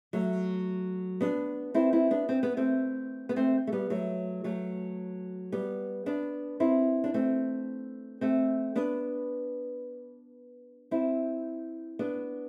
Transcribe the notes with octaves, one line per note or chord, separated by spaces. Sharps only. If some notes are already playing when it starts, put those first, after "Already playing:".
F#3 A3
B3 D4
C4 E4
C4 E4
B3 D4
C4
B3
A3 C4
B3
A3 C4
A3
G3 B3
F#3 A3
F#3 A3
G3 B3
B3 D4
C4 E4
D4
A3 C4
A3 C4
B3 D4
C4 E4
B3 D4